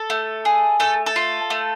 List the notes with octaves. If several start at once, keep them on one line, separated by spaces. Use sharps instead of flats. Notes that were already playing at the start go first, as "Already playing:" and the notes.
Already playing: A4
A3
G#4
A3 A4
A4
F4
A3